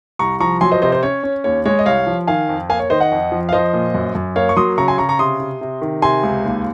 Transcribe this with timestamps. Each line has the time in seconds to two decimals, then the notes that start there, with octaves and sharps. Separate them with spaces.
0.19 C2 A#5 C#6
0.40 F3 A#5 C#6
0.61 F#3 G#5 C6
0.71 C5 D#5
0.82 C3 C5 D#5
0.92 C5
1.03 C#4 C#5
1.23 C#4
1.44 D#2 C#5
1.65 G#3 C#5
1.79 D#5
1.86 C2 C#5 F5
2.07 F3
2.27 D#3 F5 G#5
2.49 F2
2.69 A#3 F5 G#5
2.79 C#5
2.90 D#3 C5 D#5
3.00 D#5 F#5
3.11 F2
3.32 F3
3.49 F5
3.53 F3 C5 D#5
3.73 A#2
3.94 F#2
4.15 F#2
4.36 A#3 C#5 F5
4.49 C#6
4.57 F#3 C6 D#6
4.78 C#3 A#5 C#6
4.88 G#5 C6
4.98 C#3 A#5 C#6
5.09 A#5 C#6
5.19 C3 C6 D#6
5.40 C3
5.61 C3
5.82 D#3
6.02 C3 G#5 C6
6.23 C#2
6.44 D#2